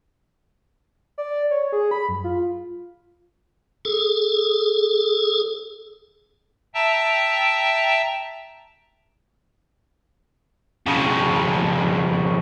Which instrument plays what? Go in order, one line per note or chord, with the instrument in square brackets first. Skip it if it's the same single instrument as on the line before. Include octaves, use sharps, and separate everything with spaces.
[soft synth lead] D5
C#5
G#4
B5
F#2
F4
[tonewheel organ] G#4 A4
[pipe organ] E5 G5 A5 A#5 E6
[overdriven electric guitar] F2 C#3